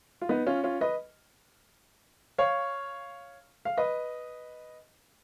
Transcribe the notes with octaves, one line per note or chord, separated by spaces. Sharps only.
F4
B3 D#4
C#4 F4
C#4 F4
B4 D#5
C#5 F5
F5
B4 D#5